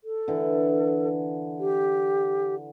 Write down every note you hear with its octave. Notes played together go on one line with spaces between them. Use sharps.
A4
D3 E3
G4